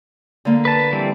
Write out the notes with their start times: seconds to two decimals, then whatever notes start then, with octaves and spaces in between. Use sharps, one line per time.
0.45 D3 A#3
0.65 B4 A5
0.93 E3 G3 C4